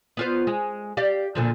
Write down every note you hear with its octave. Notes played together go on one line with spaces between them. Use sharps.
B3 F4 C5
G#3
G4 D5 F5
A#2 D3 F3